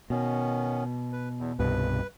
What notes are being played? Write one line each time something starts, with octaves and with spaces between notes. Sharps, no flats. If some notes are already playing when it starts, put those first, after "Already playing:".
B2 D#3 B3 C#4
B4
E2
C2 G2 B2 B4